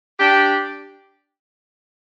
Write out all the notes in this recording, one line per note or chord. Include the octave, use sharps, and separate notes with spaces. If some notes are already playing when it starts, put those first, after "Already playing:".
D4 G4